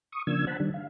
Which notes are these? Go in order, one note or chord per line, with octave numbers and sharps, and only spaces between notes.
C#6 D#6
C#3 F3 A#3 D4 E6 G#6
C5 F#5 A5 B5
D#3 G3 D4
F5